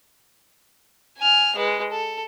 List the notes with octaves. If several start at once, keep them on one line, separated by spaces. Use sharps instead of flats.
G#5 F6
G#3 B4
A4